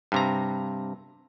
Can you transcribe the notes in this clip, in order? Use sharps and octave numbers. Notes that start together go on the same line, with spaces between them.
G2 C3 A#5